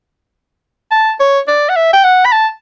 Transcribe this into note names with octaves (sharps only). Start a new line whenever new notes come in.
A5
C#5
D5
F#5
E5
G5
F#5
B5
A5